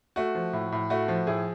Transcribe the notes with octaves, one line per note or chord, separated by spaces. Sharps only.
A3 F#4
F3
A2
A2
A3 F#4
F3
A2 G#4